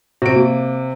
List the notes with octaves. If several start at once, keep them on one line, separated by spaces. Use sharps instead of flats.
C3 F#4 D7
A#3